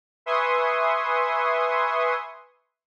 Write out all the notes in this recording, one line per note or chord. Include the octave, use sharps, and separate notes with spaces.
B4 E5 G#5 C6 C#6 D#6